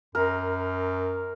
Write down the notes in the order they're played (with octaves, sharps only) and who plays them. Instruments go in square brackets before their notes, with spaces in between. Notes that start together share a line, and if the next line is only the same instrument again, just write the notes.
[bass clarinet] F#2 [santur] A#4